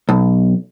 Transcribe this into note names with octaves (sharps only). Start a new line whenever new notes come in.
B1